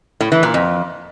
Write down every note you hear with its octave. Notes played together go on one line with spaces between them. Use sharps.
A2
E3
A#2
F2